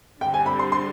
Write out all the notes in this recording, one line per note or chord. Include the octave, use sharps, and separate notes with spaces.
D3 G3 C4 G5
G#5
B5
C6
C6